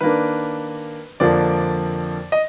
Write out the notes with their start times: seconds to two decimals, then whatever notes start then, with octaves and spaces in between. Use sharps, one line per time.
0.01 D#3 A#3 D4 B4
1.20 F2 D3 F3 A#3 D4 D5
2.32 D#5